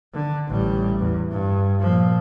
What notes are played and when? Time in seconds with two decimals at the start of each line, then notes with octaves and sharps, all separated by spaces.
0.14 D3
0.49 A1 G3
0.99 E2
1.30 G2
1.80 A#2 F3